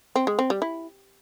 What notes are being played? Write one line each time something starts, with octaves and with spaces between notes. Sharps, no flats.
C4
G#3
C4
G3
E4